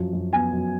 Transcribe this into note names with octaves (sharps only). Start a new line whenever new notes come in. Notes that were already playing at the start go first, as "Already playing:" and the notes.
Already playing: F#2 F3
F#2
B3 G#5
F#2